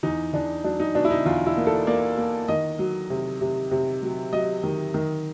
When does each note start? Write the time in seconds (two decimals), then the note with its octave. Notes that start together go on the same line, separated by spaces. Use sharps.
0.03 E2 D#4
0.33 E2 D4
0.64 F#3 D4
0.80 D#4
0.95 B2 D4
1.05 E4
1.10 D#4
1.25 E2 F4
1.46 E4
1.57 A#3
1.67 A4
1.87 A#3 D5
2.17 A#3
2.48 D#3 D#5
2.79 F#3
3.10 C3
3.41 C3
3.71 C3
4.02 F#3
4.32 F#3 D#5
4.63 D#3
4.94 D#3